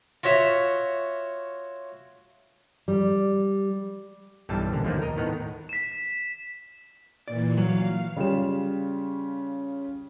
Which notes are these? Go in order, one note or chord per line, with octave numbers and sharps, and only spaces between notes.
F4 F#4 C#5 E5
G3
B1 G2 E3 G3 A5
A#1 D3
D#2 B2 F3 A3 A#3
A#4 D#5
A2 D#3 B3 A#5
B6 E7
A#2 E3 D5
F#3 F5
C#3 G3 F4 G4 C#5 E7